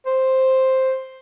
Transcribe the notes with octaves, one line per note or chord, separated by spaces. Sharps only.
C5